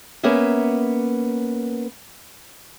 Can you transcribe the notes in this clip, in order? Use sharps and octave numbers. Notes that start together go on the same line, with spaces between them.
A#3 B3 C#4 E5